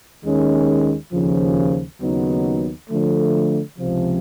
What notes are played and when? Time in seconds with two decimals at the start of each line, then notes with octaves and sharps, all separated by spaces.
0.23 D#2 D#3 G#3 C#4
1.12 D#2 C#3 F3
2.00 D#2 C#3 F#3 B3 D#4
2.89 D3 F3 A3
3.77 C#2 C3 F3